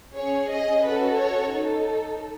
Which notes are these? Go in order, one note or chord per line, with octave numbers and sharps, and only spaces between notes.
C#4 G#4 C#5
D#5
C#4 F#4 A4 B4
C#5
D#4 A4